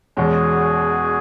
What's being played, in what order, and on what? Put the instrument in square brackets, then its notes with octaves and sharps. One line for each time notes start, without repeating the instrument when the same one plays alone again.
[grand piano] E2 B2 G#3 C#4 [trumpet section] F#4 G#4